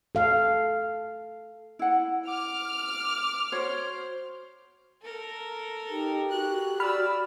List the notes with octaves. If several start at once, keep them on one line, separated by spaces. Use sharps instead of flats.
A4 F5
E4 F#5
D6 F6
F#4 C5 C#5
A4 A#4
D#4 G4
F#4 F#6
D5 B5 E6 F6